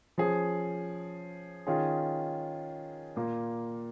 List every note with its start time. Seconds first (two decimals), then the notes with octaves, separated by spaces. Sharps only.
0.18 F3 C#4 G#4
1.67 D#3 C#4 F4 G#4
3.16 A#2 A#3 F4